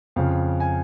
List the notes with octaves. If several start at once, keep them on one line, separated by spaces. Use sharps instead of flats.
F2 C#3 F3 F5
G#5